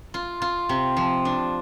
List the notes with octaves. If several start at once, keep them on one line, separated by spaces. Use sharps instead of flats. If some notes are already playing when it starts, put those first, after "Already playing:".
F4
F4
C3
F3
D4